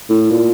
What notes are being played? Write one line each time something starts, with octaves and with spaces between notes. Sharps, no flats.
A2
A#2